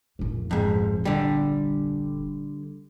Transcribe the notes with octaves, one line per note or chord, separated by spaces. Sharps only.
F1 A#1
F2 G#2
D3 G3